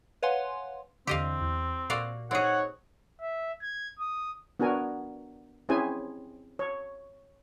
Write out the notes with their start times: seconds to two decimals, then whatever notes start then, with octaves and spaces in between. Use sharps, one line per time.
0.23 B4 C#5 F5 F#5 G#5 C6
1.07 E2 D3 C4 G4 D#5 F5
1.41 E2
1.90 A#2 F#4 D5 F5
2.31 C4 D#4 G#4 C#5 F#5
3.21 E5
3.62 G#6
3.99 D#6
4.60 B3 D4 F#4 A#4 G#5
5.69 C4 C#4 E4 G#4 C5 G#5
6.59 C#5